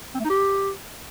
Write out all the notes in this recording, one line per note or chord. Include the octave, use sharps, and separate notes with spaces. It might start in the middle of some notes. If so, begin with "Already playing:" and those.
C4
A3
D#4
G4